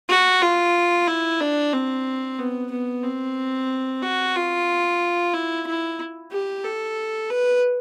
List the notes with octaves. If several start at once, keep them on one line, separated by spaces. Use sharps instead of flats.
F#4
F4
E4
D4
C4
B3
B3
C4
F#4
F4
E4
E4
G4
A4
B4